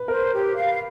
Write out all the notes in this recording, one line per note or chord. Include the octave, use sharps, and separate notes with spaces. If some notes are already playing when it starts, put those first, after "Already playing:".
Already playing: B4
A#4 C5
G4
F5